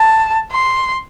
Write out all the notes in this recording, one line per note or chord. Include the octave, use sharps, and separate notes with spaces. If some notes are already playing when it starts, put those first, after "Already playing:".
Already playing: A5
C6